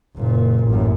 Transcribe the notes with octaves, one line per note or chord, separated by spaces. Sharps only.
F#1 A#2
A1 F#2